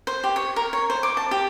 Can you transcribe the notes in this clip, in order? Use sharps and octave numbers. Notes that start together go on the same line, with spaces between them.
C5
G4
C#5
A#4
C#5
C5
D6
A5
G4